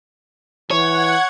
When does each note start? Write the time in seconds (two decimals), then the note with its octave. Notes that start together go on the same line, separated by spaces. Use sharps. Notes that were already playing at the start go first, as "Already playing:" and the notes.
0.71 E3 C#5 F#5 G#6